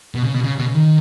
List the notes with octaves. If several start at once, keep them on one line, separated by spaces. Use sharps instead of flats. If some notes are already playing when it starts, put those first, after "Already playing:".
B2
C#3
B2
C#3
B2
C#3
D#3